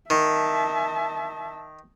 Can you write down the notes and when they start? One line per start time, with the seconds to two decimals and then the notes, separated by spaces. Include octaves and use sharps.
0.10 D#3 E5 A5